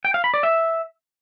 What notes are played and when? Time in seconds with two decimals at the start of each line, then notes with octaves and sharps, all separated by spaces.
0.05 G5
0.14 F5
0.24 B5
0.34 D5
0.43 E5